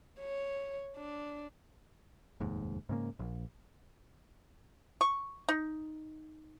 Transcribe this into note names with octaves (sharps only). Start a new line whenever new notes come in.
C#5
D4
F1 D#2 G#2
G#2 C#3 A#3
A#1
C#6
D#4